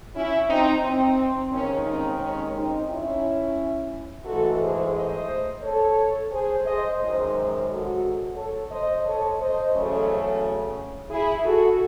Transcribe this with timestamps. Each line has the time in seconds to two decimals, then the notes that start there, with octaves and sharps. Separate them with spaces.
0.16 C#4 E4
0.49 C4 D#4
0.83 C4
1.52 D#2 D#3 G#3 C#4
1.86 C4 D#4
2.20 C#4
2.54 C4 D#4
2.89 C#4 E4
4.26 G#2 E3 A3 F#4 A4
4.60 G#4 C5
4.94 C5 D#5
5.63 A4 C#5
6.31 G#4 C5
6.66 C5 D#5
6.99 F#2 D#3 G#3 G#4 C5
7.68 F#4 A4
8.36 A4 C#5
8.71 C5 D#5
9.05 A4 C#5
9.39 C5 D#5
9.73 E2 C#3 F#3 A3 A4 C#5
11.11 E4 G#4
11.45 F#4 A4